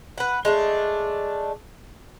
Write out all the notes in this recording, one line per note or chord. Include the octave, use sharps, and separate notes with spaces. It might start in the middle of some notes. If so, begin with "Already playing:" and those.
B4 F#5
G#3 A3 D4